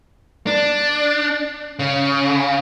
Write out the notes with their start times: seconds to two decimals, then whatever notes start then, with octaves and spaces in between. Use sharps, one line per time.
0.47 D4
1.79 C#3